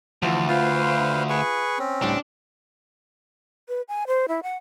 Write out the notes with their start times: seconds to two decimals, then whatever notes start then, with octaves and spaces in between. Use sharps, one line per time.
0.23 D2 E3 F3 F#4 A5
0.49 F4 B4 C5 F5
1.30 G#4 B4 C#6
1.79 C4 C#4
2.02 C#2 A2 G3 D4
3.69 B4
3.88 G#5
4.07 C5
4.28 E4
4.43 F#5